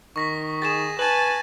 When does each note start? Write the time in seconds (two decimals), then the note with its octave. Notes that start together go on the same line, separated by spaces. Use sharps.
0.16 D#3 C#6 A#6 B6
0.62 G#4 A6 E7
0.99 B4 G#5 A5